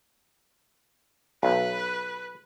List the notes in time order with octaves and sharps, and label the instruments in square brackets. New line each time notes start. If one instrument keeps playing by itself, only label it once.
[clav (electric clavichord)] B1 [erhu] B4